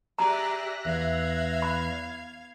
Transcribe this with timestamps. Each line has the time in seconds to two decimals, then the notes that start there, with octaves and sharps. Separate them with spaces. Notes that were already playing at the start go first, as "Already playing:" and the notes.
0.19 G4 G#4 D5 E5 A#5 F#6 A#6
0.85 E2 F5 G#6
1.62 B5